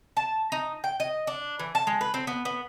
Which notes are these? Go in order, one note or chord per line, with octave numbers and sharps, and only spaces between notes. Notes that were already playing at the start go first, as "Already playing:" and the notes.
A5
D#4
G5
D#5
D4
E3
A5
G#3
B4
C4
B3
B3